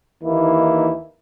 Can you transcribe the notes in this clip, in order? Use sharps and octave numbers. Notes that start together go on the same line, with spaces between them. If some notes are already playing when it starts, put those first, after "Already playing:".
D#2 E3 A#3 D#4 E4